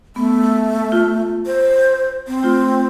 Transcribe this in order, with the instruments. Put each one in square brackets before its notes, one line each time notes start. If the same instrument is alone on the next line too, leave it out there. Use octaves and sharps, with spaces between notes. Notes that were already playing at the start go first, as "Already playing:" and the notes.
[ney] A3 [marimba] B3
[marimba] F4
[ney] C5
C4
[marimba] A3 F4